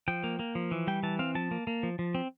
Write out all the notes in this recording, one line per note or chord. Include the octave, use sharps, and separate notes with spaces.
F3 G5
A#3
A#3
F3
E3
G3 G5
E3 A5
C4 F5
F3 A5
A#3
A#3
F3
F3
C4